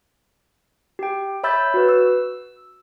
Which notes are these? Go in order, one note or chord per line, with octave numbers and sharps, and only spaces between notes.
G4 G5
C#5 E5 B5 E6 G6 A6
F#4 B4
E6